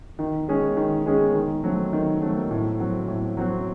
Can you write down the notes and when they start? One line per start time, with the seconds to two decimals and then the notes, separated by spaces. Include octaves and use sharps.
0.19 D#3
0.48 G#3 C#4 G#4
0.77 D#3
1.06 G#3 C#4 G#4
1.35 D#3
1.64 F#3 A3 C4
1.93 D#3
2.21 F#3 A3 C4
2.51 A2
2.79 F#3 C4 F#4
3.08 A2
3.37 F#3 C4 F#4